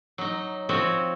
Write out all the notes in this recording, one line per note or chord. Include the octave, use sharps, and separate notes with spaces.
F#3 D#4
F3 C4 F#4 C#5